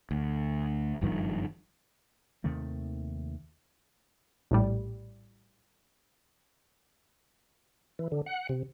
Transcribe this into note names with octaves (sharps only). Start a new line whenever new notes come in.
D2
F#1 G2 D#3 F3
D#2 C3 D#3 A3
A#1 A2 G3
E3
D3
F#5
C3